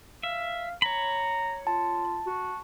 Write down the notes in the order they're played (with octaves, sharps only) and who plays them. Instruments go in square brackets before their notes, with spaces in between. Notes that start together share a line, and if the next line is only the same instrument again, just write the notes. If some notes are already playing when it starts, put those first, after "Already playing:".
[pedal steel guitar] E5 [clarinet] F5
[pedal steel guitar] C#5 B5 [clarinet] A#5
[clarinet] F4 [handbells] A5
[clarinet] F#4